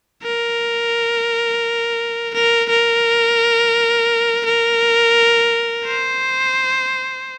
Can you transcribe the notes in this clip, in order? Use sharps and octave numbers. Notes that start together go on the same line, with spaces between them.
A#4
A#4
A#4
A#4
C5